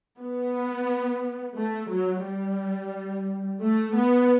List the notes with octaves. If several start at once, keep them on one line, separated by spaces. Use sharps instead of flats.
B3
A3
F#3
G3
A3
B3